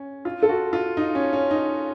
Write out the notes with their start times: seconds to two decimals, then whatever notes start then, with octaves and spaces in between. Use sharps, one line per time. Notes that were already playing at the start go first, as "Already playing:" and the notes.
Already playing: C#4
0.25 F4
0.43 A4
0.49 F#4
0.73 F4
0.97 D#4
1.15 C#4
1.33 C#4
1.51 D#4